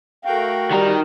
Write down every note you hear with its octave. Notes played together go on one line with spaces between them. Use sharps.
A3 F#4 A#4 F5 G5
D#3 G3 A#5